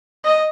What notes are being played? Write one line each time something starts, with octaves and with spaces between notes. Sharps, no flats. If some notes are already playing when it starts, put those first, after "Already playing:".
D#5